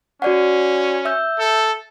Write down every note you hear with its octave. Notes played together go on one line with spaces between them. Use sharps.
C#4 F#4 D5 F#5
E5 E6 G6
A4